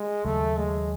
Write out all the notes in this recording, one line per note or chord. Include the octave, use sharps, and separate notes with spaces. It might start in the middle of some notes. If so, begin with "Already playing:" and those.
Already playing: G#3
D#2 C#3 F#3 A3
G#3